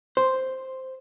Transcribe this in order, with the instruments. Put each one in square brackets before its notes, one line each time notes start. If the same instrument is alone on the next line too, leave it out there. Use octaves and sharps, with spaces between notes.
[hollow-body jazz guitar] C5